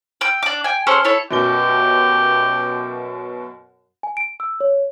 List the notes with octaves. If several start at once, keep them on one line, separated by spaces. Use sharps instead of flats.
G5 E6
D4 D6
G5 G#5
C#4 G#4 A4 C5
E4 A4 C#5
F#2 B2 G4 G7
G#5
D7
E6
C#5